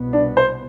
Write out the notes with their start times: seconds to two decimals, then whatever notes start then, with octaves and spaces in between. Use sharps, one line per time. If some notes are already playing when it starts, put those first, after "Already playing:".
Already playing: C2 B2 B3
0.13 D4
0.37 C5